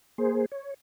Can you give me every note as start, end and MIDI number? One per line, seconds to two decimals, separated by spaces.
0.18 0.45 58
0.18 0.45 68
0.18 0.45 72
0.52 0.74 73